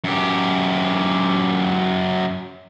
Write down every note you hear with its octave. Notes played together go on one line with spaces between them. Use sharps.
F#2 G4